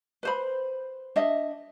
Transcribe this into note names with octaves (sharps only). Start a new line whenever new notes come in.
B4 C5 B5
D4 D#5 E5